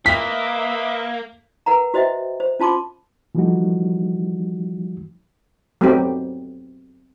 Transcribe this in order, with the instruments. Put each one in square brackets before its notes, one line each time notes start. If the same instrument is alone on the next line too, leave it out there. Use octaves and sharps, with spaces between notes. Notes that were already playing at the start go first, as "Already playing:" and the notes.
[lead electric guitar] A#3 [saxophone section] B4 D#5 E5 [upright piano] B6
[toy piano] A#4 B4 F#5 A#5
F#4 C5 D#5 E5 G5
C5
C#4 F4 A5 C6 D6
[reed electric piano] E3 F3 G3 A3 D#4 F#4
[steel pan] F#3 A3 B3 C4 D#4 G4